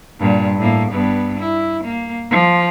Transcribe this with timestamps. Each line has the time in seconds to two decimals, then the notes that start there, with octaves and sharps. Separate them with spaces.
0.19 G2 A#2
0.58 A2 A#3
0.91 G2 B3
1.40 E4
1.84 A#3
2.31 F3